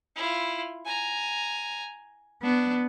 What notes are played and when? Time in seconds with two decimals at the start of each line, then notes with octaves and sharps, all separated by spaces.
0.16 E4 F4
0.85 G#5 A#5
2.43 B3 D4